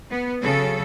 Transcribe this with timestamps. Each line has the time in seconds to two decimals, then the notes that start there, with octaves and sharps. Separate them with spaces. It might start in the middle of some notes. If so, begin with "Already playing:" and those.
0.10 B3
0.42 C#3 F#3 A4